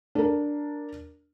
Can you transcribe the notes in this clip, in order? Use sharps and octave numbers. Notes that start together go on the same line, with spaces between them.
D4 A#4